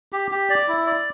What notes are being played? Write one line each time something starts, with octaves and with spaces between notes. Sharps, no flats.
G4
G4
D5
E4
D5